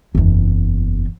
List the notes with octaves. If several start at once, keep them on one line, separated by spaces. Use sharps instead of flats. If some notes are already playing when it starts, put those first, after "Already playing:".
F#1 E2